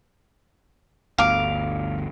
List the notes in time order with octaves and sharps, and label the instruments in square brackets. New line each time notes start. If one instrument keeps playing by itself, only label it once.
[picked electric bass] G1 D2 [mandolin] F5 D6